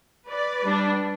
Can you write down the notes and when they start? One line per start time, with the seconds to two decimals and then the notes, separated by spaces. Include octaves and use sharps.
0.27 B4 D5
0.64 G3 D4